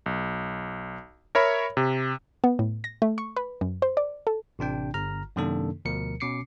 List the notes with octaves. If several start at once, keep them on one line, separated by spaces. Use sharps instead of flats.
B1
A#4 C#5 E5 B5
C3
B3
A2
A#6
A3
C#6
B4
F#2
C5
D5
A4
A1 C3 D4 G5
G1 A#5 F6
F#2 C3 D#3 A#3 D4 A4
D2 B2 F3 A#4 C#7
B2 C#4 D6 C7 C#7